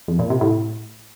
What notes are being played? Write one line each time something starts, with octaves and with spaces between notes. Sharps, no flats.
F2
A#2
C3
A2